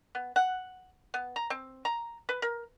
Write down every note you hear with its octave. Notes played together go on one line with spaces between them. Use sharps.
B3
F#5
B3
A#5
C4
A#5
B4
A#4